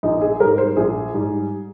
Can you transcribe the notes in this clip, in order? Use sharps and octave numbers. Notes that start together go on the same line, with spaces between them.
A#1 D#4
G#4
G#2 G3 A#4
C5
A#1 G#4
G#2 G3